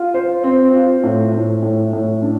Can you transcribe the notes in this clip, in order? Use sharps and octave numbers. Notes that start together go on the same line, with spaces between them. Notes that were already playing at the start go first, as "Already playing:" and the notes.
Already playing: F4
C5
C4
F4
A2
A2
A2
A2
D4